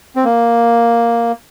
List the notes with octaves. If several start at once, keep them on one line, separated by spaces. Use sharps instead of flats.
C4
A#3